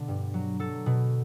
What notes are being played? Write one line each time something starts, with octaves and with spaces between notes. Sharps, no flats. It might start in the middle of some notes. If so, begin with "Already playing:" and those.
Already playing: B2 D3 B3
G2
F#3
F#3 A4
B2